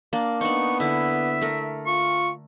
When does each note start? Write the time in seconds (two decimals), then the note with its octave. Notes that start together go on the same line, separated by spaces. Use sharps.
0.13 A#3 D4
0.41 B3 D4 D#4 C#6
0.80 D3 E4 E5
1.42 A3 A#4
1.86 F4 C#6